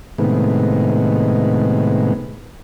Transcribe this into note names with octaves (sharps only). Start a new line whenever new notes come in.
A2 C3 D#3 G#3 B3